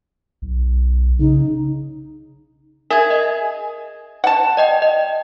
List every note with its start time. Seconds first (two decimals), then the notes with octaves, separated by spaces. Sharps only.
0.42 B1
1.19 C#3 D#4
2.91 G#4 A#4 E5 G#6
3.10 D#5
4.24 F#5 A5
4.57 D5 D#5 G5
4.82 D#5